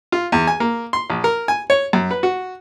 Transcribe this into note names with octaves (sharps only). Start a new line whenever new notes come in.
F4
E2
G#5
A#3
C6
A#1
A#4
G#5
C#5
F#2
B4
F#4